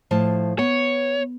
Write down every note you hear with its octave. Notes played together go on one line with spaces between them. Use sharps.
A2 F3 A5
B3 C#5